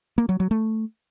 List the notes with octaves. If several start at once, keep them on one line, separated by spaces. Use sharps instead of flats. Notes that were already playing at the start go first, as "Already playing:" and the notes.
A#3
F#3
F#3
A3